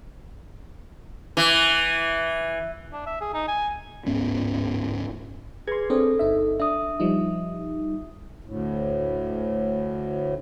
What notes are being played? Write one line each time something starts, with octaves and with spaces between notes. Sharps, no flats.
E3
D4
E5
G#4
D#4
G#5
D1 G#2 B3 C#4
G#4 B4 C6 G#6
C4 D4 A4 C5
G1 D#4 E5
D4 E5 D#6
F3 G3 D#4
D2 A2